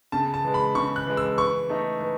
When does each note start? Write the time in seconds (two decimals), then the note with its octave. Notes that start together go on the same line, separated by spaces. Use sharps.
0.12 C#3 A5
0.34 A5
0.45 E3 G#3
0.54 B5
0.75 C#3 C#6
0.96 F#6
1.07 E3 G#3
1.17 E6
1.37 E3 C#6
1.69 A3 D#4
2.01 E3